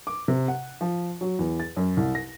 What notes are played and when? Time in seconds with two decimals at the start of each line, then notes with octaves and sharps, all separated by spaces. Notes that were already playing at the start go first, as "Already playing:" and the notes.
0.07 D6
0.28 C3
0.48 F#5
0.81 F3
1.21 F#3
1.39 E2
1.60 A6
1.77 F#2
1.97 C2
2.15 A#6